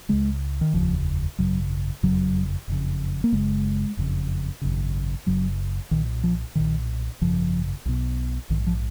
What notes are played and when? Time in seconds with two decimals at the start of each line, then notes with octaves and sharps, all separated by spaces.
0.09 C#2 C#3 G#3
0.61 D#3
0.74 F1 D#2 C#3 F3
1.38 G#1 F#2 C#3 F#3
2.03 F#1 F2 C#3 F#3
2.68 F#1 F2 C#3
3.24 A#3
3.32 F#1 F#2 C#3 G#3
3.97 F#1 F2 C#3
4.61 G#1 F#2 C#3
5.26 F#1 F#2 C#3 F#3
5.91 B1 A#2 D#3
6.23 F3
6.55 B1 A#2 D#3
7.21 G#1 F#2 C#3 F3
7.85 B1 B2
8.50 A#1 G#2 D#3
8.67 F3